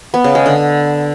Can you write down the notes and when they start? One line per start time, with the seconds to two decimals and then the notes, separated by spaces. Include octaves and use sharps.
0.14 B3
0.24 C#3
0.35 G#3
0.46 D3